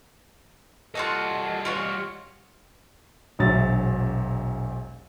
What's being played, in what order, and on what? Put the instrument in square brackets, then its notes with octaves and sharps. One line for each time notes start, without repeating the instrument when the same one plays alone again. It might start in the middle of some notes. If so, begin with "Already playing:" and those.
[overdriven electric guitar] G3 D#5 [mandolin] F4 F#4 A4
[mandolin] F4 F#4 C#5
[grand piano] E1 A#1 F#3 E5 D#6 A6